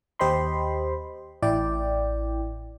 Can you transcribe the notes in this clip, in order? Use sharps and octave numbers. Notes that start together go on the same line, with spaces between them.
D#2 G4 C5 D#5 B5 C6
A1 E4 D5 G5